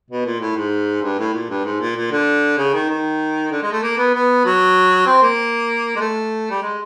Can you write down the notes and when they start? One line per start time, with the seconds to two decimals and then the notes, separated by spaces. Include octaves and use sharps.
0.10 B2
0.25 A#2
0.40 A2
0.56 G#2
1.02 G2
1.19 A2
1.33 A#2
1.49 G2
1.65 G#2
1.80 A#2
1.96 A#2
2.11 D3
2.58 C#3
2.74 D#3
2.89 D#3
3.51 D3
3.62 G#3
3.72 A3
3.83 A#3
3.98 B3
4.14 B3
4.45 F#3
5.06 C4
5.23 A#3
5.96 G#3
6.00 A3
6.50 G3
6.62 G#3